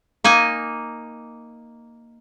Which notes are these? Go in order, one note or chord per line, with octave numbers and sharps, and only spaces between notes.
A#3 D#4 G#5